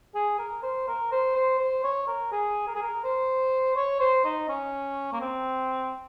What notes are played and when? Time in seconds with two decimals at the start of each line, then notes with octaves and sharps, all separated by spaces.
0.15 G#4
0.39 A#4
0.63 C5
0.87 A#4
1.12 C5
1.35 C5
1.59 C5
1.84 C#5
2.07 A#4
2.32 G#4
2.68 A#4
2.75 G#4
2.82 A#4
3.04 C5
3.76 C#5
4.00 C5
4.25 D#4
4.49 C#4
5.13 A#3
5.21 C4